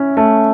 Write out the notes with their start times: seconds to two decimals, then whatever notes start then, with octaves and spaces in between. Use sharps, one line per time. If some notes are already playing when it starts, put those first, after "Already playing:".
Already playing: C#4 E4
0.17 A3